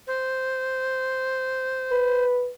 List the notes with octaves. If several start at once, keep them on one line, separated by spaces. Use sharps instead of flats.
C5
B4